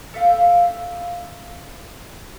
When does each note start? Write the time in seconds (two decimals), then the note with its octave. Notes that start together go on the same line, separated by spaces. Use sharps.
0.14 A4 E5 F5 G5